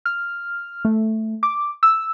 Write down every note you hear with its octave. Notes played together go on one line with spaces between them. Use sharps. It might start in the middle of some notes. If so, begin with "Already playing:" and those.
F6
A3
D6
E6